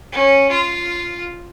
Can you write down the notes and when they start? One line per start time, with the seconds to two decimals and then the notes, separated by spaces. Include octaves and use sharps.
0.12 C#4
0.50 F4